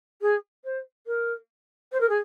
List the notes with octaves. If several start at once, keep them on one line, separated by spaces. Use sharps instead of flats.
G#4
C5
A#4
C5
A#4
G#4